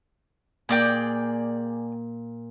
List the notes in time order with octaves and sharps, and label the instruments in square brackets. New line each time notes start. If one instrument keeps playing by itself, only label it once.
[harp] A#2 A#4 [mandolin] G#4 D5 G5